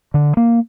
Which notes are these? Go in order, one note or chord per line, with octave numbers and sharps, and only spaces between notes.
D3
A#3